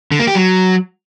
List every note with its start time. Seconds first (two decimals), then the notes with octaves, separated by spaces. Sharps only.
0.12 D3
0.19 A#3
0.27 G4
0.35 F#3